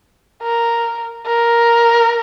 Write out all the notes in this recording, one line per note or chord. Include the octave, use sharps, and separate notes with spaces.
A#4
A#4